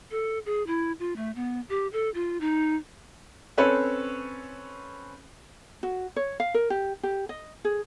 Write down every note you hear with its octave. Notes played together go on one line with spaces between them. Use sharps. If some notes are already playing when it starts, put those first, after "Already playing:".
A4
G#4
E4
F4
A3
B3
G4
A4
F4
D#4
C4 C#4 A4 B4 C#5
F#4
C#5
F5
A#4
G4
G4
D#5
G#4